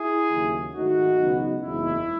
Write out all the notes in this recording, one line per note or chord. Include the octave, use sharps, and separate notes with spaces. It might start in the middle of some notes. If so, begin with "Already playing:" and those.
Already playing: E4 G#4
D#2 C#3 F#3
G#2 D#3 A3 D#4 F#4
C#2 B2 F#3 B3 D#4
F#1 E2 C#3 G#3 D#4 E4